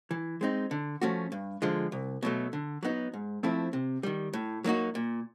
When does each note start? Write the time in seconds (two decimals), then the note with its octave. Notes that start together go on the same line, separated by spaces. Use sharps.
0.11 E3
0.41 G#3 C4 D#4
0.71 D3
1.01 F3 A3 C#4 F#4
1.32 G2
1.62 D3 F3 G#3
1.92 C2
2.22 B2 F#3 A3
2.53 D3
2.83 F#3 B3 D#4
3.14 G#2
3.43 F3 A3 C4 E4
3.73 C3
4.03 D#3 G3
4.33 A2
4.64 F#3 A#3 D#4 F#4
4.95 A#2